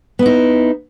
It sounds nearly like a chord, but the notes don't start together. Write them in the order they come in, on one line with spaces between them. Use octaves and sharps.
B3 E4 D#4